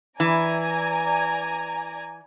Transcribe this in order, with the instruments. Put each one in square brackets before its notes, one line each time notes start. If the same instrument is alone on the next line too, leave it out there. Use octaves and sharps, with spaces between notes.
[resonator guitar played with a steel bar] E3 [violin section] D5 G#5 A#5